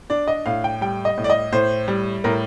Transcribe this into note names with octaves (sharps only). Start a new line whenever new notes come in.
D4 D5
D#5
A2 F5
G5
G3 G5
D#5
A2
D5
D#5
A2 C5
G3
A2 A#4